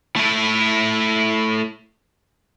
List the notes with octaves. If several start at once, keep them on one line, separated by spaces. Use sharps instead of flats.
A3 E4